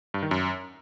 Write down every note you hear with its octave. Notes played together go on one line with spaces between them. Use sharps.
G2
D#3
F#2